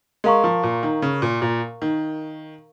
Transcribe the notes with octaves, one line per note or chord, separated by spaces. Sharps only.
G#3 A#4 F5 A#5 C#6
F3
A#2
D#3
C#3
A#2
A#2
D#3